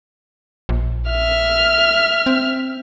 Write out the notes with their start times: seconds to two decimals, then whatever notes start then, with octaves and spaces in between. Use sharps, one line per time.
0.69 A#1
1.10 E5 F6
2.26 C4